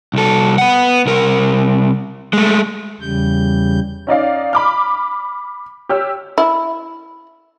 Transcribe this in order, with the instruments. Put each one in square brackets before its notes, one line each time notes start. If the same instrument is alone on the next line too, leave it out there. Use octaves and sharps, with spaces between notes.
[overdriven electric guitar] C2 A4
B3 F#5
C2 A#4
G#3 A3
[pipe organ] E2 C#3 G3 G6
[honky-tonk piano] C#4 D#4 D5 F5
B5 D6 F6
G4 C#5 E6 F6
[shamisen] E4